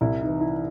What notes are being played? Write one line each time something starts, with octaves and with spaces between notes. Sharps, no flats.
C2 E4
D#4
E3
E4